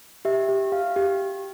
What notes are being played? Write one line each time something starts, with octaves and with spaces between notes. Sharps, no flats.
G4 E5
G4
G4 F5
G4